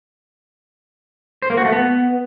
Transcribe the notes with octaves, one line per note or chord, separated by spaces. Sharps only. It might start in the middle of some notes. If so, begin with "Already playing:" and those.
C5
A#3
F#4
A3
B3